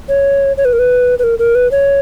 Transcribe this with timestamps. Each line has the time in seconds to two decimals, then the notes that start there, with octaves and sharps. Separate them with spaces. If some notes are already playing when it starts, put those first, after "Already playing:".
0.09 C#5
0.57 C#5
0.65 B4
0.73 A#4
0.79 B4
1.19 B4
1.24 A#4
1.39 A#4
1.55 B4
1.71 C#5